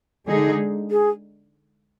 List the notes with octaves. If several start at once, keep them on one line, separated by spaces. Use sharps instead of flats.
D3 G#3 D#4 G#4
G#4